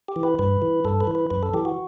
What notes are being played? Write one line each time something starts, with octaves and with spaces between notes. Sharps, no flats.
G4
E3
B4
G2 B4
E3
G2 A4
B4
E3
B4
F#2 B4
A4
E3 G4
F#4